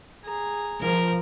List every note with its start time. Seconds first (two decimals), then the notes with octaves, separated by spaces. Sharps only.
0.25 G#4 A#5
0.81 F3 A#4